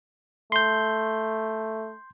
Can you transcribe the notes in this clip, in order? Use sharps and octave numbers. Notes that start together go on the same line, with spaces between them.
A3 C6 G6